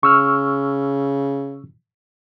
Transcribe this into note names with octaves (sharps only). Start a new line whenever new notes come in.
C#3 C#6 E6 F6